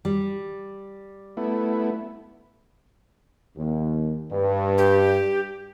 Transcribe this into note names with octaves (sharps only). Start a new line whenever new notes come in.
G3
A3 B3 E4
D#2
G2
G4